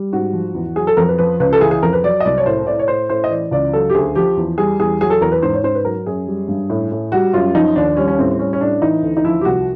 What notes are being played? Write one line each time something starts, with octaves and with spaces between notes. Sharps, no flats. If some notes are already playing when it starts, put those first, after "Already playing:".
Already playing: G3
G#2 F#4
F3
E2
F#3 G#4
A4
F2 A#4
B4
F3 B4
C#2 B4
A4
E3 G#4
G#4
F2 A#4
B4
F#3 D5
D#5
C2 D5
C#5
A2 C5
A2 D5
C#5
A2 C5
A2 C5
D#5
E3 D5
C#2 D5
F#3 A4
G4
D2 G#4
F3 G4
E2
G3 G#4
E2 G#4
F#3 G#4
A4
E2 A#4
B4
G#2 C5
C#5
G#2 C5
B4
F#3 A#4
F#2 G#4
G3
G2
A2
A2
G3 F#4
F#2 F4
F3 D#4
D#2 D4
G3 C#4
C#4
A2 C4
G3 C#4
C#4
A2 D4
E3 D#4
D2
D#4
F3 E4
G4
C2 F#4